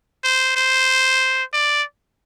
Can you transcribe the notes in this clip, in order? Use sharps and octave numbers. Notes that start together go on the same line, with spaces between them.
C5
C5
D5